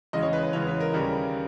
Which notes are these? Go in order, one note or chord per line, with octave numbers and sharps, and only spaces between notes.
E2 C#3 G#3 D#5
C#5
B4
B4
E2 C#3 G#3 C#5
B4
A#4
D#2 C#3 G3